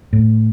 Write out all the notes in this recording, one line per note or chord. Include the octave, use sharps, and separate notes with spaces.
A2